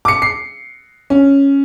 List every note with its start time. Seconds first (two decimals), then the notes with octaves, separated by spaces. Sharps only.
0.05 D6 C#7
0.22 C7
1.10 C#4